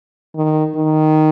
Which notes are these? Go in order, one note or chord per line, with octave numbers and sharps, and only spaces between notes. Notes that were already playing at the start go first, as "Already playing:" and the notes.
D#3
D#3